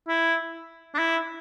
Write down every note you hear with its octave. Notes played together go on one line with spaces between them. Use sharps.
E4
D4
E4